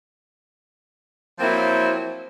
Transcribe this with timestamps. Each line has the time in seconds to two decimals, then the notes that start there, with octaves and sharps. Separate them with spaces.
1.39 F3 F#3 A#3 C4 E4